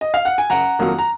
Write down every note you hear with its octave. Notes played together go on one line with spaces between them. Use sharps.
D#5
F5
F#5
G#5
F#1 F#5 A#5
F2 D#3 F#3 A#3
A#5